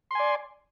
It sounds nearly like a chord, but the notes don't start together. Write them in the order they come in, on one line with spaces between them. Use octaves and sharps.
C6 G#5 D5